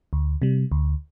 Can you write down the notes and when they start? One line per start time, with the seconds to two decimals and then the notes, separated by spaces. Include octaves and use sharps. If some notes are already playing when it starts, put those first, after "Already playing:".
0.13 D2
0.42 C3 G3
0.72 D2